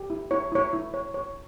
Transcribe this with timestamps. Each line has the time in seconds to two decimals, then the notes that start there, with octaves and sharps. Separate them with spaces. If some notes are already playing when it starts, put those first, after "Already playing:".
Already playing: G4
0.10 E4
0.31 E4 C#5
0.52 E4 C#5
0.73 E4
0.94 C#5
1.14 C#5